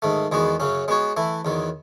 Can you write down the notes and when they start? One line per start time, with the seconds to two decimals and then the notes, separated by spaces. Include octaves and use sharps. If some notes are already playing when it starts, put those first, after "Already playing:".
0.02 G#2 D#3 A3
0.32 E2 D#3 G#3 B3 F#4
0.60 F#2 C#3 F#3 C#4
0.88 G#3 B3 F#4 C#5
1.17 E3 A3 E4
1.45 E2 D#3 F#3